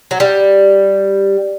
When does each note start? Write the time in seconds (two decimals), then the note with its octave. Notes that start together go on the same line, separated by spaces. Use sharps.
0.11 F#3
0.20 G3